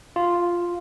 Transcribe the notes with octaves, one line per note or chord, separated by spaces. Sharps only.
F4